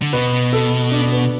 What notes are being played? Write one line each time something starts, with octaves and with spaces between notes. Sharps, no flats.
D3
B2 B4
A4
D4
D4
B3